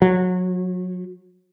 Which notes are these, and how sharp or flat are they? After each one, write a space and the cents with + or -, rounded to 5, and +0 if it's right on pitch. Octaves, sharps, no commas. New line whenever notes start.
F#3 -25